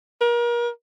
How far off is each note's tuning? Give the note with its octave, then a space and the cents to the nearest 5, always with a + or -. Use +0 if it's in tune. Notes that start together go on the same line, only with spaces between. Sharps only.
A#4 +35